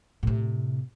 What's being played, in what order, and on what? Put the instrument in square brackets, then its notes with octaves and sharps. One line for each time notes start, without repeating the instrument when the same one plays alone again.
[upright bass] A2 C3